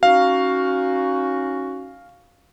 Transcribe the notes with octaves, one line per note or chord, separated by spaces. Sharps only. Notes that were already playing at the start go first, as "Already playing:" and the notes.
C#4 D#4 F#4 F5